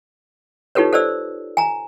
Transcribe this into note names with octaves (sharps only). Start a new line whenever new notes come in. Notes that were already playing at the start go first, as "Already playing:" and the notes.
D#4 F4 G4 A4 B4 C#5
A4 C5 D5 E6
G#5 A#5